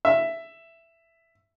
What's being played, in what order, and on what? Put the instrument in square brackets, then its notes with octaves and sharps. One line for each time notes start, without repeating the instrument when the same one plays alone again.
[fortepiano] E5